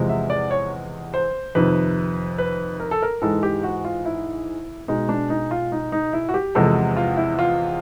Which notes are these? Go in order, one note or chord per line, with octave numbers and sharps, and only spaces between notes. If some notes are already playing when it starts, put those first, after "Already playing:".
Already playing: E2 C3 F3 G#3
E5
D5
C#5
C5
F2 C3 D#3 B4
B4
A#4
A4
A#4
G#2 E3 G#3 A4
G4
F#4
F4
E4
B2 G#3 D#4
D4
D#4
F4
D#4
D#4
E4
F#4
G4
E2 C3 F3 G#3 A4
F4
E4
F4